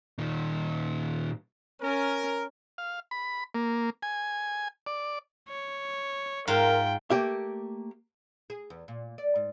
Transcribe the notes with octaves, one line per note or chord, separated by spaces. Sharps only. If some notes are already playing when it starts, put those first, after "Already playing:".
A#2 D#3
C#4 A#4
F5
B5
A#3
G#5
D5
C#5
G#2 F4 A#4 G5
A3 A#3 G4 E5
G#4
E2
A#2
D5
G#2